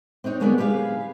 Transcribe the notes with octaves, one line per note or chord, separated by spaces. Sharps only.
C4 D4 D#4 C#5
D3 F#3 G#3 A#3 B3 D4
G4 G#4 B4 C#5 F5